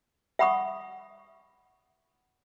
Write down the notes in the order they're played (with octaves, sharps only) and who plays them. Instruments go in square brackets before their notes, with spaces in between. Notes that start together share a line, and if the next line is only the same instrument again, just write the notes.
[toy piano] E5 F#5 B5 C#6 D#6